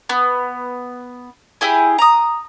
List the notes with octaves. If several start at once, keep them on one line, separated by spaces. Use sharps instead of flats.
B3
E4 G4 G#4 G#5
A#5 D#6